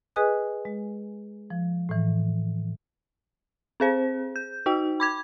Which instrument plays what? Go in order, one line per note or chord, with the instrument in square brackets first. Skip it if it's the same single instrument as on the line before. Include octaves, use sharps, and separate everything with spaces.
[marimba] G#4 B4 D#5 G#5 D#6 F#6
G#3
F3
A2 E3
[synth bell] C4 G#4 C5
G6
D#4 F#4 G5
B5 D6 G#6